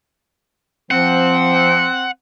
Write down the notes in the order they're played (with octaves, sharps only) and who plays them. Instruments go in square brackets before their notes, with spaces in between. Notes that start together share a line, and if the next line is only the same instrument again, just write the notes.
[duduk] F3 [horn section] C4 [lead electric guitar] F#5